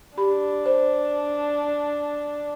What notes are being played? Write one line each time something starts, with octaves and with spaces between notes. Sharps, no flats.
D4 G4 B5
C5